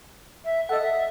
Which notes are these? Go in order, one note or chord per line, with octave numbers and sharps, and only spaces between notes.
E5
A4 D#5 F#5
E5